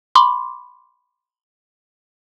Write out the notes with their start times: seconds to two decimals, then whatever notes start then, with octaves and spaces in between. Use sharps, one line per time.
0.15 B5 C6 D6